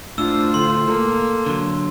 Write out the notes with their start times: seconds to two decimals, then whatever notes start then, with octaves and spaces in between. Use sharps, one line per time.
0.18 A2 D4 F4 C5 E6
0.54 D3 C6
0.88 A#3 A4
1.46 D3 F#3